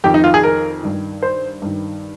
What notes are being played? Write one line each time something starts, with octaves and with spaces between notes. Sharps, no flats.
F2 D#3 G4
D#4
F4
G#4
A#4
G2 D#3
C5
G2 D#3